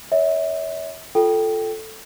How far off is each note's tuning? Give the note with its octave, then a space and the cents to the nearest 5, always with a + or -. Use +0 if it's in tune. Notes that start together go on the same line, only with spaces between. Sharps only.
C#5 +25 E5 -35
F4 +0 A4 +0 G5 -10